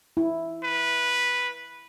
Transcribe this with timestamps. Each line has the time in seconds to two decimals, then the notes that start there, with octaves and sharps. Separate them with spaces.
0.17 E4
0.63 B4